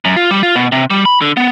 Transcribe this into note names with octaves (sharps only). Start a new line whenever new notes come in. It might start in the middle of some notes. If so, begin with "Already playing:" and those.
F#2
F4
G3
F4
B2
C3
G3
B5
D3
B3